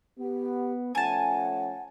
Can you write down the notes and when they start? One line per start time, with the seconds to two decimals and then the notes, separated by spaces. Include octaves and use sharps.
0.18 B3 G4
0.95 F3 A3 C#4 F#5 G#5 A5